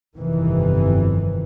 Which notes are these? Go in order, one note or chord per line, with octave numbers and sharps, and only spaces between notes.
G1 F2 C3 D#3 E3